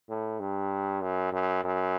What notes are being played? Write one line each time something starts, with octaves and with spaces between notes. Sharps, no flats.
A2
G2
F#2
F#2
F#2